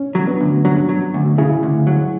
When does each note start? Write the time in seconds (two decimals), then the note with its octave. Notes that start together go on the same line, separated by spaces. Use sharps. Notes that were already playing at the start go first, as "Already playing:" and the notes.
Already playing: C#4
0.15 F#3
0.27 B3 D4
0.41 D2
0.65 F#3 D4 F#4
0.89 F#3
1.14 D2
1.38 C#3 E4 G#4
1.63 D2
1.87 F#3